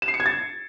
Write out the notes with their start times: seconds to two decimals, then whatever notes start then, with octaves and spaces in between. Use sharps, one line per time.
0.02 E7
0.08 C7
0.14 C#7
0.20 G#6
0.26 A6